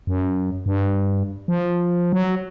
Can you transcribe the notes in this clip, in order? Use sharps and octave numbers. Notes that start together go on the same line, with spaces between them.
F#2
G2
F3
F#3